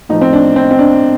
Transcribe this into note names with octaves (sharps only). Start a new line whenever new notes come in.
A2 F3 D#4
C4
D4
C4
C4
D4